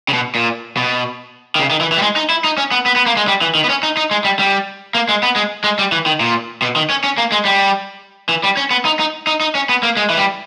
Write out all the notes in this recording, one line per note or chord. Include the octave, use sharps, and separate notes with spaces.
C#3
B2
A#2
B2
D#3
C#3
D#3
E3
E3
G3
G#3
D#4
E4
D#4
C#4
B3
B3
B3
A#3
G#3
G3
E3
D#3
B3
C#4
D#4
D#4
G#3
G3
G3
A#3
G#3
B3
G#3
G#3
G3
E3
D#3
A#2
B2
D#3
C#4
C#4
A#3
G#3
G3
E3
G3
C#4
B3
D#4
D#4
D#4
D#4
C#4
B3
A#3
G#3
E3
G3